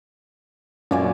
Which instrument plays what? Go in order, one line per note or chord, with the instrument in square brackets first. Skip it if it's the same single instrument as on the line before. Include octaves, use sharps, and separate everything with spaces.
[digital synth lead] F#2 [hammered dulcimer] A#2 D5 G#5